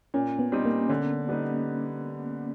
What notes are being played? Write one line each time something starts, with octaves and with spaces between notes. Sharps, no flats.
A#2 C#4
B3
G3 C4 D#4
A#3
D3 C#4
G3 B3 D#4